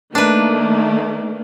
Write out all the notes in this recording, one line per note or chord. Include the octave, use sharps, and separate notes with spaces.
D#3 A3 A#3 D4 B4